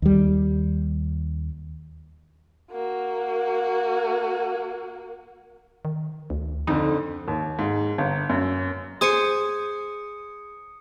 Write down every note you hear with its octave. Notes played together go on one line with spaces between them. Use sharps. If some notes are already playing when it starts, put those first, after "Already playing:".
D#2 G3
A#3 F#4
D#3
D2
F2 D3 D#4
D#2
G#2
G1
F#2
G#4 C5 G#5 D#6 C#7